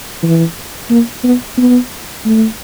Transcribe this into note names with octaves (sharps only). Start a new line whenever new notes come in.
E3
A#3
B3
B3
A3